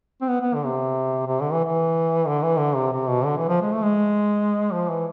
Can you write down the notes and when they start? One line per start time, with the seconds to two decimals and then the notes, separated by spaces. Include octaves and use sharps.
0.22 C4
0.29 B3
0.41 B3
0.54 D3
0.65 C3
1.27 C3
1.40 D3
1.52 E3
1.65 E3
2.26 D3
2.42 E3
2.58 D3
2.75 C3
2.92 C3
3.08 B2
3.25 D3
3.37 E3
3.48 F3
3.62 G#3
3.72 A3
3.82 G#3
4.72 F3
4.89 E3